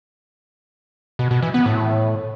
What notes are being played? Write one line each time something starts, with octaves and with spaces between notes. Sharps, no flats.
B2
B2
E3
B3
A2